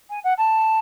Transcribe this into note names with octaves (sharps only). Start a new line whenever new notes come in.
G#5
F#5
A5